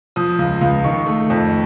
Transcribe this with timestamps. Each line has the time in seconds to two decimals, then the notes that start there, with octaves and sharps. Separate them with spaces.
0.16 F3 D#6
0.39 C#2
0.61 C#2
0.84 D#3 C#6
1.06 A3
1.30 F2